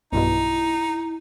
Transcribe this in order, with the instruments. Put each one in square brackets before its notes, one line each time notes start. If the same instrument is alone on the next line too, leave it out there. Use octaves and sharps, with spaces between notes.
[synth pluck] B1 G2 B2 [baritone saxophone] D#4 [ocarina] E4